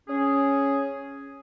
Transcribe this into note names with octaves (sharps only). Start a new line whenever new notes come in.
C#4 G#4